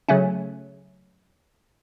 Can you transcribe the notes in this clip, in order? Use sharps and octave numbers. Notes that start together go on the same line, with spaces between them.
C#3 F#3 A3 C#4